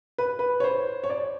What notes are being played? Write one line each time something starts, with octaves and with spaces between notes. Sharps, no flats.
B4
B4
C#5
C5
C#5
D5